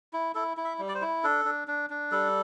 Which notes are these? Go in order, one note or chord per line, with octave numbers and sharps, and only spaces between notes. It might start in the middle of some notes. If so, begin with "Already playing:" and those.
E4
E4 A4
E4
E5
G3
D5
C5
E4
D4 A4
D4
D4
D4
G3 A4